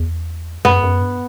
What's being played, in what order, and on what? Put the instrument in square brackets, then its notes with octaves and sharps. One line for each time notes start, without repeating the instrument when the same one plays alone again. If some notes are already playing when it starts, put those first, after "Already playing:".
Already playing: [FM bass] E2
[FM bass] F#2 [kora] B3
[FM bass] F#2
G2